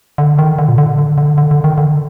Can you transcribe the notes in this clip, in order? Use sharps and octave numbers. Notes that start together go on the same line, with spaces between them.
D3
D#3
D3
A#2
D3
D3
D3
D3
D3
D#3
D3